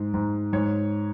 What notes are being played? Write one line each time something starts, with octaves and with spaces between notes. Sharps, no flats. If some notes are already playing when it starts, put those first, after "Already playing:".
Already playing: G#2
G#2
G#2 C#5